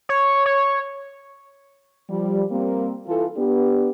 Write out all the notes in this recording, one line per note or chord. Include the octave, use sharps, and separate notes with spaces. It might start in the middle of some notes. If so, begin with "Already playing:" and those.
C#5
C#5
F3 G3
G3 A#3 C4
E3 F4 A4
B3 D4 G4